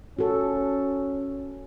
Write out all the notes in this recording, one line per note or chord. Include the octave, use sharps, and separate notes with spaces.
C#4 F#4 A4